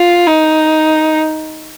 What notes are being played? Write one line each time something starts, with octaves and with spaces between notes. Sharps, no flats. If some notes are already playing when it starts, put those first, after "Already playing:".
Already playing: F4
D#4